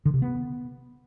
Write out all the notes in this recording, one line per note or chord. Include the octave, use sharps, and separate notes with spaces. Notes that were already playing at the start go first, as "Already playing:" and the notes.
D3
C3
B3